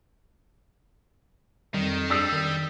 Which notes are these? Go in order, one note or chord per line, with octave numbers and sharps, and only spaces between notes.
F2 D#3 G3
G3 D4 D#6 E6 C7
D#3